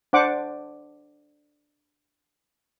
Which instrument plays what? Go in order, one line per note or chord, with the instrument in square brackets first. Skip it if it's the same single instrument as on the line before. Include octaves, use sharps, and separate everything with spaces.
[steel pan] D4 C5 F#5 D6